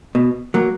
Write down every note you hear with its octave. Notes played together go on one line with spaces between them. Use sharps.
B2
F#3 A#3